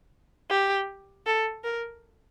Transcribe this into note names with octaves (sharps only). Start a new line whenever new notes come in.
G4
A4
A#4